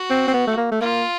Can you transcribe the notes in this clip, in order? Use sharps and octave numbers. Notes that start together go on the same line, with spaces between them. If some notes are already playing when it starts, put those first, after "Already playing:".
Already playing: F#4
C4
C4
B3
A3
A#3
A3
A#3 F4